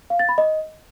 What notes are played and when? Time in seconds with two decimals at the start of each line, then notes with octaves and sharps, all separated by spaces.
0.10 F5
0.19 A6
0.29 B5
0.38 D#5